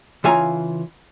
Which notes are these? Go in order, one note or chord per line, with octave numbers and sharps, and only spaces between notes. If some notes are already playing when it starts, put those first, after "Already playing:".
C#3 E3 F4 G#5 A#5